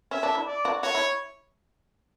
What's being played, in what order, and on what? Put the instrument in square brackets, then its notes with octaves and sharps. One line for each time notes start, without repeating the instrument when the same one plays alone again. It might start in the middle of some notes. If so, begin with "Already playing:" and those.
[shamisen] C#4 [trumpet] E5
[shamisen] D4
E4
[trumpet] D5
[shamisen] F#4
[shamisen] F#4 [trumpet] C#5
[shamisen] E4